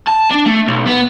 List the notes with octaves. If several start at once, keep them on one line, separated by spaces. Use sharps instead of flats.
A5
D4
A3
B1
B3